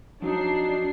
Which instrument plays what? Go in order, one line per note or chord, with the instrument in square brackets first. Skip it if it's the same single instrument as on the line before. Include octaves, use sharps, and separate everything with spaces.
[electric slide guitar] F2 F#3 [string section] D4 C7 [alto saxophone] D#4